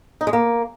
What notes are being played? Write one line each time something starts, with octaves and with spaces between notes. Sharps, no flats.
D#4
G#3
A#3